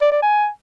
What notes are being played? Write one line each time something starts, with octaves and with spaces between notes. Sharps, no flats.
D5
D5
G#5